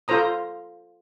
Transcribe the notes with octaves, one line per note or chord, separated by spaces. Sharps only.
F4 A4 C5 A#5 D#6